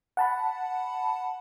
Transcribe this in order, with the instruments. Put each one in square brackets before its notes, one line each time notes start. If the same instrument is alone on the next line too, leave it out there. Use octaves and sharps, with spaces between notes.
[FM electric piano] F#5 A5 B5